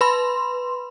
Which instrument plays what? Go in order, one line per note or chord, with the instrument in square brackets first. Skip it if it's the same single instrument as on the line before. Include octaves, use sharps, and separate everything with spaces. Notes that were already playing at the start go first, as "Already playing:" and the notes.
[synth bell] B4 B5 C6